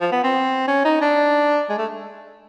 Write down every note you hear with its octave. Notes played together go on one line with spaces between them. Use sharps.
F3
B3
C4
C#4
D#4
D4
G#3
A3